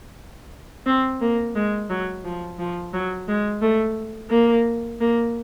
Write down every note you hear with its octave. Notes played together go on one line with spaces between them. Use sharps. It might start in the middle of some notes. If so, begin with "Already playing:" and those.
C4
A#3
G#3
F#3
F3
F3
F#3
G#3
A3
A#3
A#3